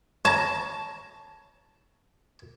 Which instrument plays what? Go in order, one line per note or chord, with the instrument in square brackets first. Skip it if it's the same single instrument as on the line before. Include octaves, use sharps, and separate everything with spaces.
[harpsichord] C#5 A#5 [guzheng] A5